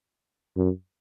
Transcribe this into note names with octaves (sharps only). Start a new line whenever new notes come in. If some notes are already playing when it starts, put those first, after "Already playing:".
F#2